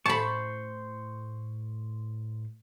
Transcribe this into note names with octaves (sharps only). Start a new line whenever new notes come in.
A2 C5 A5 B5 C#6